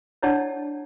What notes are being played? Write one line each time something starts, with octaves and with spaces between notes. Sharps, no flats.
D4 E4 C#5 D5 F#5 A5